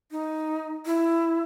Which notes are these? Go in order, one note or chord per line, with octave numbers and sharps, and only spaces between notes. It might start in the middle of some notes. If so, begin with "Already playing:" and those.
D#4
E4